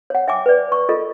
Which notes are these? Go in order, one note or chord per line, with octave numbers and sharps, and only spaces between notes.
C#5 F#5
E5 G5 G#5 D6
B4 D5
C#6
F4 A4 A#4 D#5